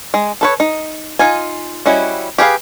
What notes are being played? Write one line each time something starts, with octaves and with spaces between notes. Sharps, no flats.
G#3
A4 B4 C#5
D#4
D#4 F4 G#5
G3 C#4 E4 F#4 D#5
G4 G#4 B4 F5